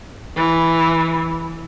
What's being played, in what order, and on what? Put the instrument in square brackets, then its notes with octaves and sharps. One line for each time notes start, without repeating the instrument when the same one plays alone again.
[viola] E3